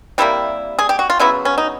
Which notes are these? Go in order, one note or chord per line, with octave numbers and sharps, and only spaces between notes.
C3 E3 G3 A#3 E4
G#4
G4
F#4
F4
C#3 F#3 B3 E4
C#4
D#4